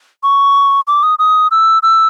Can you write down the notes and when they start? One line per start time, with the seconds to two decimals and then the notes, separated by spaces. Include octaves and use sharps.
0.23 C#6
0.87 D6
1.03 D#6
1.19 D#6
1.51 E6
1.83 E6